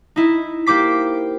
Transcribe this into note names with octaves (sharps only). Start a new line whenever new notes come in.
D#4 E4
A#3 G4 C5 D6 B6